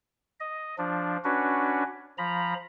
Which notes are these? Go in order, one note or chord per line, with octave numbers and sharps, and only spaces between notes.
D#5
F3 D4
C#4 D4 F#4 B4
F3 A#5 B5